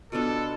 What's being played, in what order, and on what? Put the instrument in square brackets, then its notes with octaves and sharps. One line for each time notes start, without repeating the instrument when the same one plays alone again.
[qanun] B2 B3 D4 F4 [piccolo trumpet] A4